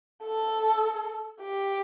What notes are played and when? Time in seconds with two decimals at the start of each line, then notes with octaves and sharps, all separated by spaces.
0.24 A4
1.41 G4